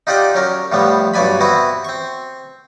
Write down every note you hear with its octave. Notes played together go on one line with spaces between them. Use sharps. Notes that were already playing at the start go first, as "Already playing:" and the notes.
D#4 F4 G4 D5 F#5 G5
F#3 C#4 A#4
A2 F3 G3 B3
B1 G2 F#3 D5 G#5 B5
B3 C4 E4 F#4 B4
C4 C#6